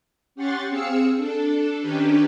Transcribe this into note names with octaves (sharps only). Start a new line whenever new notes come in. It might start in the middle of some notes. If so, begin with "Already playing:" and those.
C#4 G4 F#5 C6 C#6 A6
C4 G#4 F5 E6 C#7
D4 A4
D#3 C#4 D4 G4 B4